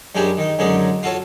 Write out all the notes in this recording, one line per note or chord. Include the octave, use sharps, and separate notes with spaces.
F#2 G3 G#3 D4 G4 G#5
D#3 D#4
F#2 D3 G#3 C#4 D#4
F4 F#4 A4 C#5